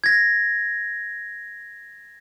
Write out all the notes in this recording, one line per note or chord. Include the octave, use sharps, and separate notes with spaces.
G#6 A#6